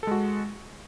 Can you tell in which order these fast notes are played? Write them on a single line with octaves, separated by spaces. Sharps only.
A4 G#3 F#4